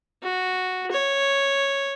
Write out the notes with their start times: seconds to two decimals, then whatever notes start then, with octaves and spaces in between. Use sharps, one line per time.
0.23 F#4
0.91 C#5